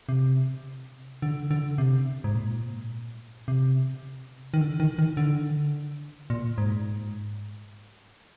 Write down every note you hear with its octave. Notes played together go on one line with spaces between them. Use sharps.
C3
D3
D3
C3
G#2
A#2
C3
D#3
D3
D#3
D#3
D3
A#2
G#2